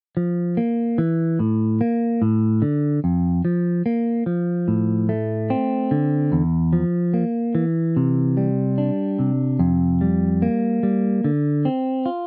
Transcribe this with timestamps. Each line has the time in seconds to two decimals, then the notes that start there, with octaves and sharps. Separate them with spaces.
0.17 F3
0.57 A#3
0.98 E3
1.39 A2
1.81 A#3
2.22 A2
2.62 D3
3.04 F2
3.45 F3
3.86 A#3
4.26 F3
4.68 A2
5.09 A3
5.50 C4
5.91 D3
6.32 E2
6.73 F3
7.14 A#3
7.55 E3
7.97 C3
8.37 G3
8.78 D4
9.19 C3
9.59 F2
10.01 G3
10.42 A#3
10.83 G3
11.24 D3
11.65 C4
12.06 F4